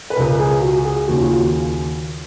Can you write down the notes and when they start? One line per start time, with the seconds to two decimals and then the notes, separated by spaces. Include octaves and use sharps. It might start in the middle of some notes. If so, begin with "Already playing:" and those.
0.10 B4
0.16 C#2 C#3 A#4
0.39 G#4
0.62 F#4
0.85 G#4
1.07 D#2 C#3 F#4
1.21 F4
1.34 F#4